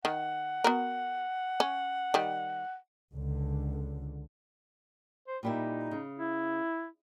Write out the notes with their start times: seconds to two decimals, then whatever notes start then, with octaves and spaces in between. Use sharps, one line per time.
0.05 D#3 F#5
0.64 B3 F#4 A#4
1.60 C#4
2.14 D#3 G3
3.13 C#2 D3
5.28 C5
5.43 A#2 G3 D#4 E4
5.91 C#3
6.18 E4